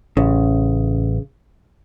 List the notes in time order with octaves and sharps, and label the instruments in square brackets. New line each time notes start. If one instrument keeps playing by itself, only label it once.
[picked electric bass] A1 [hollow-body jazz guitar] C#3